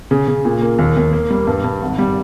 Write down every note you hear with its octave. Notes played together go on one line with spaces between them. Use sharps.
C#3
C#3
A#2
A#3
D#2
D#2
A#3
G3
G2
G2
G#1
G3